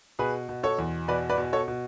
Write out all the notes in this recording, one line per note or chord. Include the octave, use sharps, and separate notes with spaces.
B2 G#4 B4
B2
A4 C#5
E2
B2 B4 D5
B4 D5
B2
A4 C#5
B2